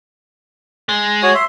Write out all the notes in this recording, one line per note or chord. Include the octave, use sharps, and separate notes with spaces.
G#3
F#4 C#5
E5 C6